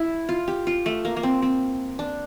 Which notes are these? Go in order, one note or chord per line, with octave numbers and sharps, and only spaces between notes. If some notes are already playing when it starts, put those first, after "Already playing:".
Already playing: E4
F4
G4
F4
A3
A#3
A#3
C4
C4
D4